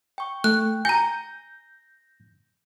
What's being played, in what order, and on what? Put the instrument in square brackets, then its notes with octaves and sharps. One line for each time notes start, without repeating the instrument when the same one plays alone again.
[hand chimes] G5 C#6
[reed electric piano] A3 [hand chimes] G5 [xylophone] F#6
[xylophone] G#5 A#5 [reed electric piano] G6 [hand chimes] A#6